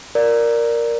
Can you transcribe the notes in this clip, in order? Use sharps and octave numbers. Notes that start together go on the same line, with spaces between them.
A#4 D5